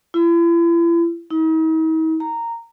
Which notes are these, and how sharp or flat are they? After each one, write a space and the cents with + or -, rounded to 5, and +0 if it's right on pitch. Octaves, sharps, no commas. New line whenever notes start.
E4 +40
D#4 +45
A#5 -10